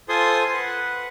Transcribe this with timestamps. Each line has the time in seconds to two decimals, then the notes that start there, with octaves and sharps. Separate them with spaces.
0.09 F4 A4 C5 G#5 C6 D#6
0.53 B4 F#5